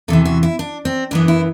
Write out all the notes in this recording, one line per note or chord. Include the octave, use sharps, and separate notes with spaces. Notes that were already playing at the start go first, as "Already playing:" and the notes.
E2 C3 E3 A4
F#4
E4
D4
C4
F#2 E3 B3 D4
E4